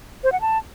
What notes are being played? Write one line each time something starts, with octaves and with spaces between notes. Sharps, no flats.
C5
F#5
A5